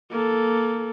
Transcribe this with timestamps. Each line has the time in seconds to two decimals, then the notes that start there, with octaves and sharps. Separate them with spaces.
0.11 A#3 A4